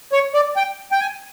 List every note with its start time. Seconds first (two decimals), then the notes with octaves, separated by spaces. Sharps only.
0.13 C#5
0.34 D5
0.56 G5
0.92 G5
1.00 G#5